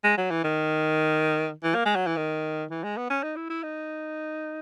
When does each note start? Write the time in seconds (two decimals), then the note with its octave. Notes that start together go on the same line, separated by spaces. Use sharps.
0.04 G#3
0.17 F#3
0.31 E3
0.44 D#3
1.64 E3
1.75 A#3
1.86 G#3
1.96 F#3
2.07 E3
2.17 D#3
2.71 E3
2.84 G#3
2.97 B3
3.10 C#4
3.23 D#4
3.37 E4
3.50 E4
3.63 D#4